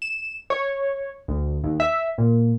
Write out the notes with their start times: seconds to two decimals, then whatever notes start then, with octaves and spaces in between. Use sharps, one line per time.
0.02 E7
0.50 C#5
1.28 D2
1.64 D#2
1.80 E5
2.18 A#2